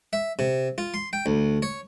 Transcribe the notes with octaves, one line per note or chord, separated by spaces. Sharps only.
E5
C3
F4
C6
G5
D2
C#5